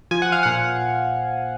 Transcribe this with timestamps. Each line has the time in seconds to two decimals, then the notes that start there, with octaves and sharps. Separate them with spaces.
0.11 F3 G#5
0.22 F#5
0.32 F5
0.43 A#2 F#5